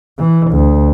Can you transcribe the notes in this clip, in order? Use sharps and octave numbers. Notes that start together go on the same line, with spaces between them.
E3
D2